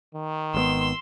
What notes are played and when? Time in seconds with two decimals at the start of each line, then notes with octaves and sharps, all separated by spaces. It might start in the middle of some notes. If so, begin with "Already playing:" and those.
0.15 D#3
0.54 G#1 C#3 B3 C6 E6